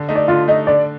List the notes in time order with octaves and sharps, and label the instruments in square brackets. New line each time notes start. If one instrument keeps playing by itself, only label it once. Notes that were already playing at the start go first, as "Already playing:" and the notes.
Already playing: [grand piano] D3
A3 D#4
[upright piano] D5
[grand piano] D3 [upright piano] F4
[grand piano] A3 D#4 [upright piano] D#5
[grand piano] D3 [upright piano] D5